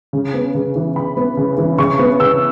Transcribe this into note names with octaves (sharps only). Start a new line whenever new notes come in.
C#3
B3
C#3
E3
C#3 B5
B3
C#3
E3
C#3 C#6
B3
C#3 E6